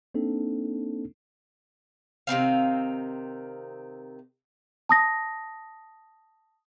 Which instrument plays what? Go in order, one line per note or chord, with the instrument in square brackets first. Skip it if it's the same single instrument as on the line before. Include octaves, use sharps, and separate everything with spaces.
[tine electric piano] A#3 C4 D4 D#4 A4
[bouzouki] C3 D#3 C4 F5
[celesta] A5 D#6 A#6